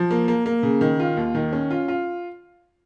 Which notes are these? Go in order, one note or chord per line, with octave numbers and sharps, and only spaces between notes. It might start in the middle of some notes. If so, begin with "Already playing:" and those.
Already playing: F3
A#3
A#3
A#3
C#3
D#3
F4
D#2
D#3
C#4
F4
F4